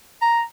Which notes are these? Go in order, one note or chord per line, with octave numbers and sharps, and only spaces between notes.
A#5